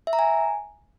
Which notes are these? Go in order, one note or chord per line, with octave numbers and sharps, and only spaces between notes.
E5
A#5
G#5